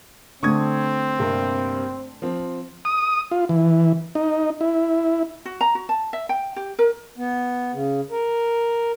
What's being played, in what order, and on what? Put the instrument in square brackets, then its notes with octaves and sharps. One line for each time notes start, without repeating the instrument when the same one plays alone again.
[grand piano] D3 A3 [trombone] C4 [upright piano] C#6 D#6 G#6
[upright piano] G2 C3 A#3
F3 C4
[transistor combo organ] D#6
F4
E3
D#4
E4
[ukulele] F#4
A#5
F#4
A5
E5
G5
G4
A#4
[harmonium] B3
C#3
A#4